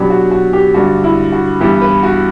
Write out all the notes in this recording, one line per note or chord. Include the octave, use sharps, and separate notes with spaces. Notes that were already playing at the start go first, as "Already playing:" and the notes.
Already playing: B2 F#3 B3 D4 G4
F#4
F#4
G4
G2 D3 A3 D4 F#4
E4
F#4
G2 E3 B3 E4 G4
B4
F#4